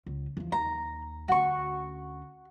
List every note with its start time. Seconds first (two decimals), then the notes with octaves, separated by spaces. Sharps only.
0.06 C#2
0.37 E2 F3
0.52 D#2 A#5
1.28 D2 C#4 F#4 C#6